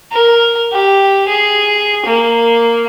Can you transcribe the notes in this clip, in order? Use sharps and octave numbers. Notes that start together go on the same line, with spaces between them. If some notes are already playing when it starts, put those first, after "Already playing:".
A#4
G4
G#4
A#3